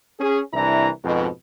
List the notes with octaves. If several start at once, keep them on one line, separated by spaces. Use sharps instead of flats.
C#4 G#4
C2 E3 D4 E4 A#5
F2 G#2 B2